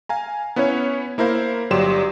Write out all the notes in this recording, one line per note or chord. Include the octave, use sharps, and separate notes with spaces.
F5 G#5 A#5
B3 C#4 E4 B4 C#5
A#3 E4 A#4 C5 F5
G1 F#3 G4 D5 C6 E7